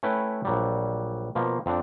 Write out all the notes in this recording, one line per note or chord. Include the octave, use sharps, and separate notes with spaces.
A3 C#4 E4 B4 G5
A#1 F#3 G3
B2 F3 A#3
F2 C4 D4